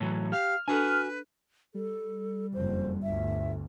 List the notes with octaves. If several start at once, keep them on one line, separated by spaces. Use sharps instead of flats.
A2 E3 F#3
G4 F5 F6
D4 F#4 A4 B4 G#5
G3 A4
F#1 F2 C5
G1 D2 E5